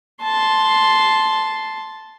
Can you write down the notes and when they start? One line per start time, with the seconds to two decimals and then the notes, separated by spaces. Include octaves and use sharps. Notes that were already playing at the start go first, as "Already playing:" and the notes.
0.23 A5 C6